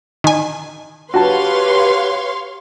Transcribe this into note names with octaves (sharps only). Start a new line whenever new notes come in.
D#3 G#5
F#4 G4 B4 C#5 F5 A5 C6